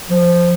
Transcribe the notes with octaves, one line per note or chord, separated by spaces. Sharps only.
F3